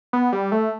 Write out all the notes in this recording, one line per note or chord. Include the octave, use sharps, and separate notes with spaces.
B3
G3
A3